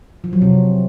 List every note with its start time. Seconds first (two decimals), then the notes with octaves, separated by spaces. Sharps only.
0.24 F3
0.33 F#3
0.42 C3